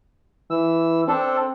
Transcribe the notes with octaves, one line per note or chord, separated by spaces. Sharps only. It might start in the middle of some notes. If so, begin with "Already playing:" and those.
E3 E6
C4 D4 A4